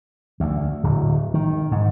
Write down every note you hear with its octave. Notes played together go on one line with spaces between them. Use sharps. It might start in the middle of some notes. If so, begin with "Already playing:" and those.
D2
D1
D#3
G#2